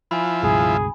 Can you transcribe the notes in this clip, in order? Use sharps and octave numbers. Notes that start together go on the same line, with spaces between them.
F3 E4 G#5 B5
C#2 G2 B2 G#4